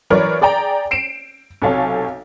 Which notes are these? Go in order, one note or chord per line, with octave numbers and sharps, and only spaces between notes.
E3 F#3 A#4 B4 C#5 D5
G#4 D5 G5 A#5
C7 D7 E7
B1 C3 A4 C#5 F5 G#5